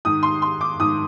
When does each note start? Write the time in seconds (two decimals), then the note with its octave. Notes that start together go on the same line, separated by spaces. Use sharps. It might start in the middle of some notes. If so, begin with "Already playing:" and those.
0.05 G#2 D#3 D#6
0.23 C6
0.42 C6
0.61 D6
0.80 G#2 D#3 D#6